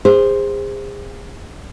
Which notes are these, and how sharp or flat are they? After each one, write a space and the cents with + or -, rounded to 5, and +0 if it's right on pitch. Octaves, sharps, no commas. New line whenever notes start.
G#4 -35 C5 +0